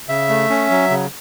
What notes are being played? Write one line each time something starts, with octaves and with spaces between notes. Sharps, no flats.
C#3 E5
A3
C#4
F#3
C#3